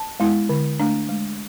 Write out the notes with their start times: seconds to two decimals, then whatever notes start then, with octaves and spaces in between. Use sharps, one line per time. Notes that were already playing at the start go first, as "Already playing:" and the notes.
Already playing: A5
0.20 G#3 B3 E4
0.49 D3
0.79 A3 D4
1.09 G#3